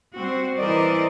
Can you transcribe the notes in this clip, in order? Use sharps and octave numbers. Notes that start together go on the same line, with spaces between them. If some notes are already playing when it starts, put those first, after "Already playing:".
G3 C4 F#4 C5
E3 A#4 C5 D5 D#5